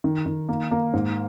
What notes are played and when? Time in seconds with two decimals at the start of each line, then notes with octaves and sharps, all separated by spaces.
0.04 D#3
0.26 D#3
0.49 A#3
0.71 A#3
0.93 G#2